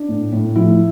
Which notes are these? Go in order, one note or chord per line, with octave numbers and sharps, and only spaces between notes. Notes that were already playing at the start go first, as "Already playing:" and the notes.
Already playing: D4
A2
A2
F3 E4